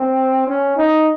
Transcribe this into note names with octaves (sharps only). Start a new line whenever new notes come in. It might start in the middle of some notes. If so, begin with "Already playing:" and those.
Already playing: C4
C#4
D#4